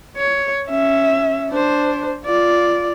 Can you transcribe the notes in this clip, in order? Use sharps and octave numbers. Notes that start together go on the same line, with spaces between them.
C#5
C#4 E5
D4 C5
F4 D5